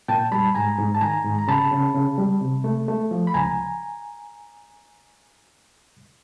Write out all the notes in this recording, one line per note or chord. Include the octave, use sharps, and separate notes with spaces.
A#2 G5 A5
G3 A5 B5
G#2 G#5 A#5
G#2
A5
D#3 G#5 A#5
G#2
A#5
C#3 A5 B5
C#3
C#3
G3
C3
A3
A3
F3
B5
C#2 G#5 A#5